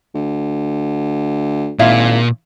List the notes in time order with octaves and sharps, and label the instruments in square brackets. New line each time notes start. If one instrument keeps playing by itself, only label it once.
[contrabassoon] D2
[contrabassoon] G#1 [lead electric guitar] A#2 [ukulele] E4 F5